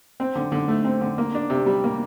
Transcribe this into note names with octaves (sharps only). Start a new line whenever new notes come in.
C4
D3
D3
A3
C4
D3
A#3
D4
C3
G3
A#3